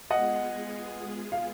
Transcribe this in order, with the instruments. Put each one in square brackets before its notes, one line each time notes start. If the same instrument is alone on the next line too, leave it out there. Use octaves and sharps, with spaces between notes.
[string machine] G#3 B3 F4 G#4 [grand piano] D#5 F#5
[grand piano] F5